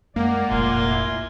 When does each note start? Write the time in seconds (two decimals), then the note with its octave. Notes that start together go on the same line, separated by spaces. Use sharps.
0.16 F#2 G#3 A#3 D5 F#5
0.50 F1 A#1 A2 F4 G#5 C6
0.86 E4